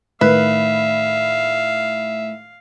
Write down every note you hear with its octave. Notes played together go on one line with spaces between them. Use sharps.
A2 D#3 B4 E5 F5